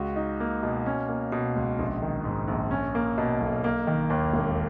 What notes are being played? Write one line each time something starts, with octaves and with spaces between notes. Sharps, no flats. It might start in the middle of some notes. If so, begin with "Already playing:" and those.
Already playing: C#2 C#3 F#4
D#4
A#3
B2
C#4
A#3
B2
C#2
A#1
D#3
G#2
A#1
C#4
A#3
B2
B1
A#3
D#3
D#2
E1